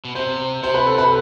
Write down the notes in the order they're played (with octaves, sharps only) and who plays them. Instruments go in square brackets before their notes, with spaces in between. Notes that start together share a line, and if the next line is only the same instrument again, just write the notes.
[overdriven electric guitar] B2
[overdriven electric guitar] C3 [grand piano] C5
[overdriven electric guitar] C3 [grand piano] C5
[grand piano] B4
A4
B4